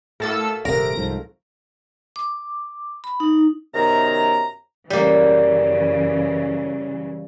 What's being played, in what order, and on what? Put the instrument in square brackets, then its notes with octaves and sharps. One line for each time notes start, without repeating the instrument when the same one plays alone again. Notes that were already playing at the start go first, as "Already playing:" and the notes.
[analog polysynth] A2 A4 E6 [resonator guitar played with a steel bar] A3 A#3 F#4
[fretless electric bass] D#1 G#1 C3 [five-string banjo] A#4 [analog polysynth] A#6 D7
[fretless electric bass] C2 G#2 F3
[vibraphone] D6
B5
D#4
[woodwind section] F#2 C3 D#3 B3 A#5
[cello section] F#2 C#3 E3 [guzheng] G3 A#3